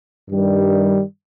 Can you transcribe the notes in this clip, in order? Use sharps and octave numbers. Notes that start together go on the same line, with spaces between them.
G2 D#3 G3